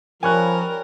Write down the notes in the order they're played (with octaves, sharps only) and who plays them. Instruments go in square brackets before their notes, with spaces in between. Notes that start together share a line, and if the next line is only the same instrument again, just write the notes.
[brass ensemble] F3 [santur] G3 C#4 F#5 [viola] A#4 [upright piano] G#5 C#6 F#6